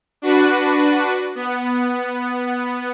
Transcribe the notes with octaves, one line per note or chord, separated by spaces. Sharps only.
D4 F#4 B4
B3